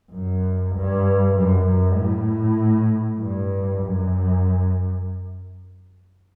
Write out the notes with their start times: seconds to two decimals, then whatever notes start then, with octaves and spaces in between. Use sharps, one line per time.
0.12 F#2
0.74 G2
1.35 F#2
1.66 F#2
1.96 A2
3.20 G2
3.82 F#2